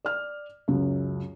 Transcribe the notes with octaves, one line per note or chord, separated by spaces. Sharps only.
D5 F6
C#2 F#2